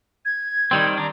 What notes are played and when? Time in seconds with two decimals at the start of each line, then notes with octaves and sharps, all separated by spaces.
0.25 G#6
0.71 D#3 G3 C4
0.97 D4 A#5